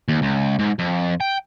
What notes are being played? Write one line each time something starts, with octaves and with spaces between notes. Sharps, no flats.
D#2
C#2
G#2
F2
G5